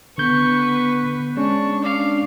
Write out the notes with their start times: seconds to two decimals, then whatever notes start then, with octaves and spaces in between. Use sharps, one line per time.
0.18 D3 B3 B4 C#6 G6
1.37 G#3 C#4 D4 C#6
1.84 D4 F5 D6